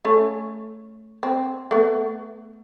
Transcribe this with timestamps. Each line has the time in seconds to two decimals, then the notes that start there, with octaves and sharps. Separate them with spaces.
0.05 A3 C#4
1.23 C4
1.71 A3 B3